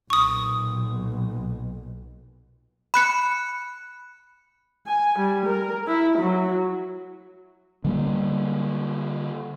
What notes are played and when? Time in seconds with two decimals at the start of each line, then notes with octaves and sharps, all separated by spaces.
0.10 B1 A#2 C#6 D#6
2.94 B5 F#6 C#7
4.88 G#5
5.18 G3
5.47 A#4
5.87 E4
6.19 F#3
7.84 D3 G3 A#3